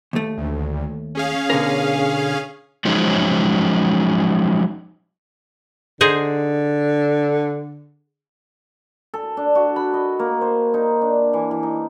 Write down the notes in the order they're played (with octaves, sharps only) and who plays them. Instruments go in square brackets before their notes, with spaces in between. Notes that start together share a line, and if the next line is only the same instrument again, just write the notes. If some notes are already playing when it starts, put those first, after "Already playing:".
[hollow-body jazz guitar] D#2 A3
[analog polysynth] D2
C#4 G#4 F5
[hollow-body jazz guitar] B2 D3 A#4
[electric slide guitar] F3 F#3 G#3 C#4 D#4 C5
[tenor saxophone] D3 [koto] D#4 G#4 C5
[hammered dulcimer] A4
D4
F#4
B5
D#5
A#3
C5
D#4
D4
E3
E3
D#4